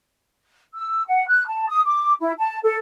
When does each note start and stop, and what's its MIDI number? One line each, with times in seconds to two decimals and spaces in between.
0.74 1.02 88
1.07 1.25 78
1.28 1.46 90
1.47 1.65 81
1.67 1.81 87
1.85 2.13 86
2.20 2.32 64
2.38 2.59 81
2.63 2.76 69